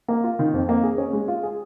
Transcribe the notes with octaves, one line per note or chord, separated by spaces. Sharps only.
A#3
F4
D#3
F2
A#3
G#4
C#4
G#3
F4
G#4